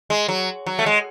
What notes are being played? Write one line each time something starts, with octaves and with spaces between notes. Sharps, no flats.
G#3
F#3
F#3
A3
G#3